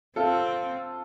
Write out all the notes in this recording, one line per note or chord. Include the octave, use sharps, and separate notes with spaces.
C4 F4 A4